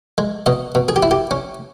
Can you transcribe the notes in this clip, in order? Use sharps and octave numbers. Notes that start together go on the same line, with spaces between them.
G#3
B2 D#5
B2
G#4
G4
E4
G4
C#4